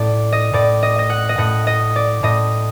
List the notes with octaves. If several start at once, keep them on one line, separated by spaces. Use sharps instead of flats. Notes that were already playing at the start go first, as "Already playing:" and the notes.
Already playing: A2 D5
D#5
A2 D5
D#5
D#5
F#5
D#5
A2 F#5
D#5
D5
A2 D#5